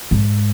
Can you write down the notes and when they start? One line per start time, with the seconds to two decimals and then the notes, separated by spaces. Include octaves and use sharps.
0.11 G#2